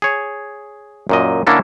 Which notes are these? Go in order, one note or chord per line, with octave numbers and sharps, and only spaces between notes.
G#4 C#5
F#2 A#2 D#5
D3 A#3 C#4 D4 E4 A4